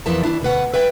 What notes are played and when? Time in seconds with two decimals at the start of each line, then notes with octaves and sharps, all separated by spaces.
0.06 E2 E3 F3 A#4 E5 A5
0.23 D#3 F3 D4 E4
0.42 D2 B2 B4 F#5
0.74 B4 E5 G5